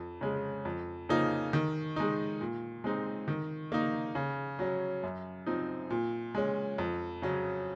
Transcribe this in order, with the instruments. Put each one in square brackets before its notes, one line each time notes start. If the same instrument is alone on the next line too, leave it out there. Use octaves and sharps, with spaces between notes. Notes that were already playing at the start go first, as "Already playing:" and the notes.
Already playing: [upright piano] F2
C#3 G#3 C#4
F2
C#3 F3 A#3 D#4
D#3
G#3 D#4
A#2
G#3 C4 D#4
D#3
A#3 D#4
C#3
F#3 C#4
F#2
F3 C4 D#4
A#2
G#3 C#4
F2
C#3 F#3 C#4